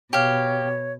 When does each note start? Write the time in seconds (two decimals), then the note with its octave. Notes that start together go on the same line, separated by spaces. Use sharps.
0.13 B2 G4 C#5 F5